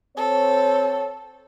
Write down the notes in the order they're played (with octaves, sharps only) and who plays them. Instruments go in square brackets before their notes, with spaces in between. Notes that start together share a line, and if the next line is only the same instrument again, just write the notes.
[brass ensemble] C4 C#5 [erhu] A4